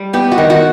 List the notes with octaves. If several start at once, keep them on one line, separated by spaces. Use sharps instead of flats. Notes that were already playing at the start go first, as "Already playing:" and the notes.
Already playing: G3
B3 G4
F#4
D#3
F#4